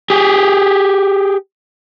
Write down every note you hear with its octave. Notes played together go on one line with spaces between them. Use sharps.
G4 G#4